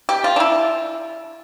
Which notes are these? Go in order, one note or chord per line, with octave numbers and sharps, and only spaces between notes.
G4
F4
D4
E4